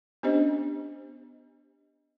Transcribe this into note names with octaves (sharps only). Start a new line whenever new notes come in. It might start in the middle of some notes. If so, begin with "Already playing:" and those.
B3 C#4 D4 G4 C5 D#5